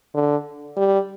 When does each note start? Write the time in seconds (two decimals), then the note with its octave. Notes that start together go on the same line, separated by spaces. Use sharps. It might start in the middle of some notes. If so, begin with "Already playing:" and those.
0.14 D3
0.76 G3